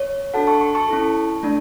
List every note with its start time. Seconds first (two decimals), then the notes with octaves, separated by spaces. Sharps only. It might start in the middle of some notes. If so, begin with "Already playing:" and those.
Already playing: C#5
0.34 D4 F#4 A4 F#5 A5
0.47 A5 C#6
0.61 A5 C#6
0.75 A5 C#6
0.88 C#4 E4 A4
1.43 A3 D4